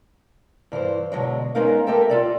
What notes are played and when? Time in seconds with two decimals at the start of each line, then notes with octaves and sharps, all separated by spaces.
0.72 G2 E3 G4 C5
1.12 B2 D3 F#3 G#3
1.55 G#3 B3 C#4 D#4 A#4 F5
1.86 G4 A4 A#4 E5 G5 A5
2.10 F4 A4 D5